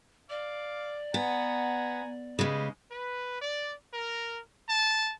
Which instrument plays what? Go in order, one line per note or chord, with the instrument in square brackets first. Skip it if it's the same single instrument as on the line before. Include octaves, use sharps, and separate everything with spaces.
[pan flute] D5 [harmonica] F5 D6
[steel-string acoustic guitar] B3 [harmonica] F#5 G#5 A#5
[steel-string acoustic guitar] C#3 G#3 [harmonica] G3 B4 D#5
[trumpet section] B4
D5
A#4
A5